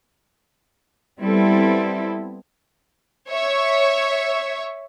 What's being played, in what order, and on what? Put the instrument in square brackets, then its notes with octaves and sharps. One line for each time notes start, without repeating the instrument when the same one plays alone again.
[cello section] G3 B3 C4 E4 A4
[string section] C#5 E5